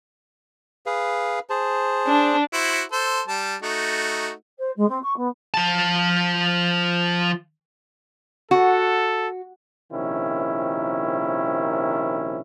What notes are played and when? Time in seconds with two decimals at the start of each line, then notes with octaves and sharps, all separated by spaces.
0.86 G#4 B4 F5
1.50 G#4 C5 A5
2.07 D4
2.53 E4 F#4 C5
2.92 A4 C5
3.28 G3 A5
3.62 A3 D#4 F#4
4.58 C5
4.76 G#3
4.88 C4
5.02 C#6
5.16 B3
5.54 F3 A5
8.51 F#4 A4
9.92 A#1 C3 D#3 C#4 E4